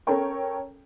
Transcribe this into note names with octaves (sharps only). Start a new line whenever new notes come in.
C#4 A4 A#4 C#5 G5